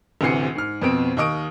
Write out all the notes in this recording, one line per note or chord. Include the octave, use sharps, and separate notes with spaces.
A1 D2 C3 E3 C7 C#7
G#2 F6
F2 B2 B3 C4 D7
D#2 D#5 C#6 D#6 D7